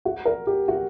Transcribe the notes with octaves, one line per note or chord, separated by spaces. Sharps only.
F#4
A#4
G4
F#4